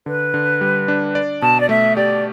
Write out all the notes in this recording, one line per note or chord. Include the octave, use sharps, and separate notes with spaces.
D3 B4
D3
G3
D4
D5
B2 A5
D5
A3 E5
G4 D5